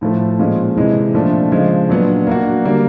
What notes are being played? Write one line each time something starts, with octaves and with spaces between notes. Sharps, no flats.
A2 F3 A3
A#2 F3 G#3 C#4
C3 E3 G#3
A#2 F3 A3 D4
C#3 F3 G#3
A#2 F#3 B3 D4
A#3 D4 F#4
D3 G3 A#3